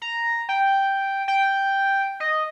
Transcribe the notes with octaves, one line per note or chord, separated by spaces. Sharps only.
A#5
G5
G5
D#5